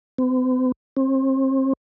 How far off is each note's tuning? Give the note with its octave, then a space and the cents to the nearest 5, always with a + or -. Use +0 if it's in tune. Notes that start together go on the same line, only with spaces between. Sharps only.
C4 -45
C4 +35